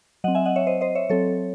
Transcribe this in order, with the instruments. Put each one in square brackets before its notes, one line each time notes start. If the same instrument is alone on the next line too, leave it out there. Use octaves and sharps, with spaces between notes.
[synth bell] F#3 C4 D#5 F#5
E5 G#5
D#5 F#5
C#5 E5
C5 D#5
C5 D#5
C#5 E5
F#3 C4 A4 C#5